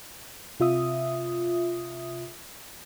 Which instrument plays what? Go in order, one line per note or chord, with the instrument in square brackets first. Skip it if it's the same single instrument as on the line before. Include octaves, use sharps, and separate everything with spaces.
[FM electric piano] C3 F4 E5 D#6